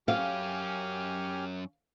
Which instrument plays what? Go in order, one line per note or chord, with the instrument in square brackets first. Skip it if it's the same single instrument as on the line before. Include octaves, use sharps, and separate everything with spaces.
[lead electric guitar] F#2 C#4 [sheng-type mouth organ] G4 G#5 F6 [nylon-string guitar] F5